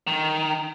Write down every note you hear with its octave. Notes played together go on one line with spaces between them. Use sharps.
D#3